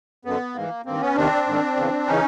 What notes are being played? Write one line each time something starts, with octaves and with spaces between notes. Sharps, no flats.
F#2 D3 B3
G#2 E3 A#3
G2 D#3 A#3 C4
B3 C#4
E2 C3 D#3 C4 D4
G#2 D#3
E2 C#3 E3
C#3 E3 C#4 D#4